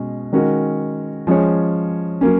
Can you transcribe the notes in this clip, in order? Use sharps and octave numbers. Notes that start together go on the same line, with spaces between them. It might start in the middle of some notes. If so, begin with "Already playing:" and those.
Already playing: B2 G#3 C#4
D#3 G#3 C#4 F#4 A#4
F3 G#3 C#4 G#4 C#5
F#3 A#3 C#4